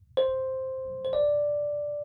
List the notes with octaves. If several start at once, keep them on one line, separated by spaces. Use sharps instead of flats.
C5
C5
D5